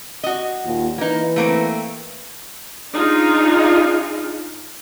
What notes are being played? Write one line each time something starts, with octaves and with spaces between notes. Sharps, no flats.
F#4 D#5
D#2 A#2 F4
E3 A#3 D#4 B4
A3 A#3 C4
D4 D#4 F4 G#4